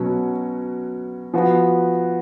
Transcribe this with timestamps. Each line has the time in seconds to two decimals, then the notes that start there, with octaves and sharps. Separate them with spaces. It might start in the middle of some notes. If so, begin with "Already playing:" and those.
Already playing: B2 F#3 C#4
1.34 F3 B3 F#4